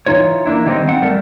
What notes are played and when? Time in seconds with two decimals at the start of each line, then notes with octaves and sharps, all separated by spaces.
0.06 E3 F3 D#4 F4 C#5
0.46 A#3 B3 D4 E4
0.66 D#3 G3 A3 C4 D#4
0.87 C4 F#5
1.02 G3 A3 A#4